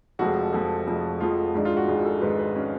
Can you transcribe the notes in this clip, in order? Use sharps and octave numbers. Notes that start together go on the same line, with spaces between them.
F1 F2 F3 G#3 F#4
F1 F2 F3 G#3 A4
F1 F2 F3 G#3
F1 F2 F3 G#3 F4
G#1 G#2 G#3 D4
F4
F#4
G#1 G#2 G#3 G#4
A4
G#1 G#2 G#3 B4
B4
G#3 C#4